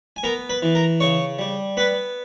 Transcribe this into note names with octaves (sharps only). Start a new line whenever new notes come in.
G#5
B3 A#4 A#5
B4 B5
E3
A#4 A#5
C#3 C#5 C#6
G3
B3 B4 B5